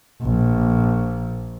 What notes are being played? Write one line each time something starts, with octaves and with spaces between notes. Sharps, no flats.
A#1